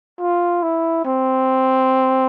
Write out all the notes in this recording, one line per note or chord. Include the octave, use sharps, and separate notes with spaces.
F4
E4
C4